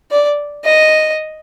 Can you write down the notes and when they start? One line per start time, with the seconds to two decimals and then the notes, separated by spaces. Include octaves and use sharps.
0.11 D5
0.64 D#5